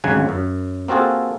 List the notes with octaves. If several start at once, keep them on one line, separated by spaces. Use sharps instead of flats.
G#1 D2 C#3 F#3 F#5 G#5
F#2
A#3 C4 F4 F#4 G#4 A4